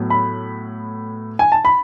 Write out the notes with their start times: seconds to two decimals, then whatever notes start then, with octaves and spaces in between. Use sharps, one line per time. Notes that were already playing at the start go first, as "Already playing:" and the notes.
Already playing: A2 F#3 B3
0.10 B5
1.39 G#5
1.52 A5
1.65 B5